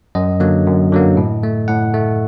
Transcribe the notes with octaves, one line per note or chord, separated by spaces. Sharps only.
F#2 D#5
D3 F#3 A#3
F#2
D3 F#3 A#3
A2
A3
A2 F#5
A3